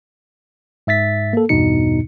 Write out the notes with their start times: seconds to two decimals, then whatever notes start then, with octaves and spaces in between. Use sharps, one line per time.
0.87 G#2 E5 A6 B6
1.33 A#3 A4
1.49 A#1 E2 G2 B2 D#4 C#7